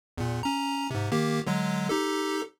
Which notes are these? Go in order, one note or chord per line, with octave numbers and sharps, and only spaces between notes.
E2 A#2
C#4 A#5
G#2 C3
D#3 A#3 G4
D3 F#3 G#3
D#4 G4 A4